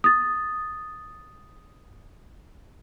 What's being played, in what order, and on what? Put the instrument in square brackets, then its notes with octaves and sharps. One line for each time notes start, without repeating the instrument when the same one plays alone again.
[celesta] D#6 A6